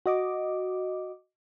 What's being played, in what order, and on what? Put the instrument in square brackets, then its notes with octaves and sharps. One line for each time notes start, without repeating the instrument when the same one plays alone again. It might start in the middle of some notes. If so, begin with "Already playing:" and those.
[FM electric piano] F#4 D#5 D6